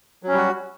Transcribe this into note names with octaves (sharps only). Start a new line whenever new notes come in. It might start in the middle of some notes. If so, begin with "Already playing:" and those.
F#3 G3 C#4 F#4